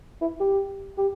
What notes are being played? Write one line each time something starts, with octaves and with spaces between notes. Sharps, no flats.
E4
G4
G4